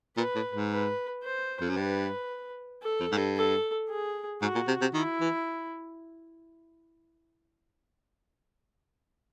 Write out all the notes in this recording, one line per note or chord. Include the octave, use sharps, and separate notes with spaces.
A#2 B4
A2
G#2
B4
C5
F2
F#2
G2 B4
A4
F2
G#2
G2
A4
G#4
G#2 F#4
A#2
C3
C3
D#3 E4
E3